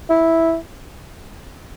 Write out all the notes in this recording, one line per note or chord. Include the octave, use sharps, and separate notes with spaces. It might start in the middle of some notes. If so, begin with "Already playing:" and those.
E4